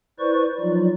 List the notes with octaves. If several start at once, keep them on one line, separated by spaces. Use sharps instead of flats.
E4 B4 C5 D5 C#6
F3 F#3 D#4 F4 D5